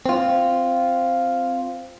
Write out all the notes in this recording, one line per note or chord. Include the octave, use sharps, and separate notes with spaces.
C4 F4